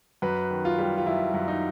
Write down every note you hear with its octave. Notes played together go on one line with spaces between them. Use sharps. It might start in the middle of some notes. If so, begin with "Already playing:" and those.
F#2 B4
D#3
F4
G3
F4
F#2 E4
F#2
D#4